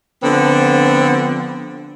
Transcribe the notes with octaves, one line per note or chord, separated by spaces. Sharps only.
D3 F3 B3 C4